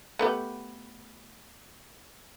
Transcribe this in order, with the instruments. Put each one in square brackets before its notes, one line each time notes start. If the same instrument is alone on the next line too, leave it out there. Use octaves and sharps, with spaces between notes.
[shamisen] A3 B3 G4